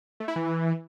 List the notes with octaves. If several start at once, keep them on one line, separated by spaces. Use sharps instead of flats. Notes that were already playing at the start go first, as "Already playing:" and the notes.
A3
E4
E3